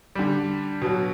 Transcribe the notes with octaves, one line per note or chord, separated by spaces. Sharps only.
D3 G3
B2 F#3